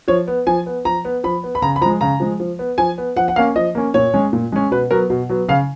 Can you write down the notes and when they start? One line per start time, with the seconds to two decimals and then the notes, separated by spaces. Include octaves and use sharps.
0.08 F3 C#5
0.27 B3
0.47 F3 G#5
0.66 B3
0.85 F3 A#5
1.05 B3
1.24 F3 B5
1.44 B3
1.55 B5
1.62 C#3 A#5
1.76 B5
1.81 F3 A#5
1.85 G#3
2.01 C#3 A#5
2.20 F3 G#3
2.40 F3
2.59 B3
2.78 F3 G#5
2.98 B3
3.17 F3 F#5
3.28 F#5
3.36 A#3 C#4 F5
3.56 F3 D#5
3.75 A#3 C#4
3.94 A#2 C#5
4.14 G#3 C#4
4.33 A#2
4.52 G#3 C#4
4.71 B2 B4
4.91 F#3 B3 A#4
5.10 B2
5.29 F#3 B3
5.48 C#3 F5